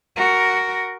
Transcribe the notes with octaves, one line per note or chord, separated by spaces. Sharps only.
F#4 A#4